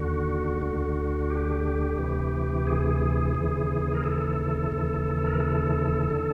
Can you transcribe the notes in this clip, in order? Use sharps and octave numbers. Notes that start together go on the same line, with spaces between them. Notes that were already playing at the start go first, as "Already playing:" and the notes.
Already playing: D#2 D3 F#4
D2 D3
G4
D2 C3 E3
G#4
D#2 C#3 E3
A#4
A4
D#2 C#3 E3
A#4
A4
D3